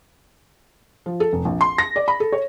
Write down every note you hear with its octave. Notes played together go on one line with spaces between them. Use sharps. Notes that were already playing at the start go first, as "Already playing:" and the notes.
F3
A4
F1
A#1
C6
A#6
D5
B5
A4
C#5